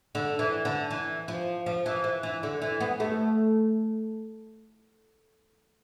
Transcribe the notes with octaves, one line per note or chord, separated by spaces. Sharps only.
D3
E3
D3
E3
F3
F3
E3
E3
E3
D3
E3
B3
A3